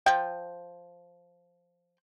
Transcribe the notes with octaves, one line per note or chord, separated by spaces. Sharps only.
F3 C5 G5